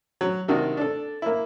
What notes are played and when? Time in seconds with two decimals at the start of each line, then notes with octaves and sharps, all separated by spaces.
0.21 F#3
0.48 C3 D#3 D4 F#4
0.77 D4 A4
1.22 A#3 E4